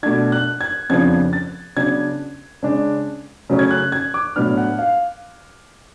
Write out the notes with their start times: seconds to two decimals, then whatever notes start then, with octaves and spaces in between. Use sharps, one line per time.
0.03 B2 A3 D4 G#6
0.32 F#6
0.61 G#6
0.90 F2 C#3 F3 B3 D4 G#6
1.33 A6
1.76 C#3 F#3 B3 D4 G#6
2.63 C#3 G#3 D4
3.50 C#3 F#3 A3 C#4
3.59 G#6
3.71 F#6
3.92 G#6
4.14 D6
4.36 A2 F#3 B3 D4 F6
4.57 F#5
4.79 F5